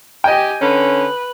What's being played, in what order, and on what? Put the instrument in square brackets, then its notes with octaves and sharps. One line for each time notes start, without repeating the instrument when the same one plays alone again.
[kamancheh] G4 G#5 [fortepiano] D#5 G5
[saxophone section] D3 C#4 [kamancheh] B4